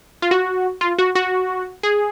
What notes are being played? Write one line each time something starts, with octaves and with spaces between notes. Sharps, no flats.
F4
F#4
F4
F#4
F#4
G#4